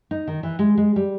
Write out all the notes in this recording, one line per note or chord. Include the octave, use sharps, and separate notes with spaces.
D#4
D#3
E3
G#3
G#3
G3